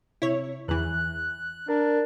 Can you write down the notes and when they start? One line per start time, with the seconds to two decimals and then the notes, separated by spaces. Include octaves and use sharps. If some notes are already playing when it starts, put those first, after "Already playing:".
0.22 C3 E4 C#5
0.68 E2 E3 F#6
1.69 D4 A#4